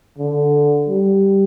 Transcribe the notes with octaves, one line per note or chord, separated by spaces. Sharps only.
D3
G3